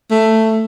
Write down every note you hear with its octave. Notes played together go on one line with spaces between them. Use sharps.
A3